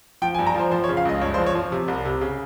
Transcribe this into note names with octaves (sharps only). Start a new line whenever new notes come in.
F3 G5
G#5
G2
A#5
F3 C5
F3 C5
C#5
C#3
F5
C#2 D#5
G2 C#5
C5
F3
C#5
F3
C3
C2
C3
C#3